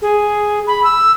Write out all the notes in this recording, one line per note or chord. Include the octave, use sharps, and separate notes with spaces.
G#4
B5
E6